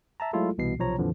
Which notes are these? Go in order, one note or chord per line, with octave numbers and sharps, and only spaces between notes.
E5 A5 A#5
F#3 G#3 A3 E4 F4 A4
C2 B2 E3 C7
B1 C3 F3 C#5 A#5
F2 A#2 D3 E3 F3